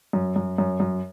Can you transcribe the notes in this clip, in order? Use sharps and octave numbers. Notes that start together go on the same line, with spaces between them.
F#2
F#2
F#2
F#2